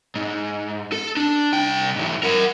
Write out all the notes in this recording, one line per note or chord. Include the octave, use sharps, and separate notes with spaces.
G#2
A4
D4
C2 G5
G#2 E3
A#4 F#5